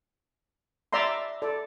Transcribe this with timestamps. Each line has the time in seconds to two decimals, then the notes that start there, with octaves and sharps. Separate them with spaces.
0.93 D5 E5 A#5 C6
1.42 A4 D5